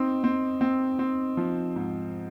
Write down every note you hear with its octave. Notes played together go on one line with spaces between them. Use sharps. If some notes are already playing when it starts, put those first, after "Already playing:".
Already playing: C4 D#4
C4
C4
C4
F3
G#2